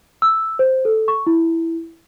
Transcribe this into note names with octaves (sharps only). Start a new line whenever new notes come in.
E6
C5
A4
C#6
E4